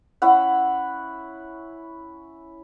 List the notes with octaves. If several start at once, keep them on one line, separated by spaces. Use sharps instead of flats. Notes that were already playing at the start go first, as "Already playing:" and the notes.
C#4 E4 F#5